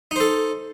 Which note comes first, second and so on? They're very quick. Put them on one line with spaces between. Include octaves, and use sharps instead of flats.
D#4 C5 A4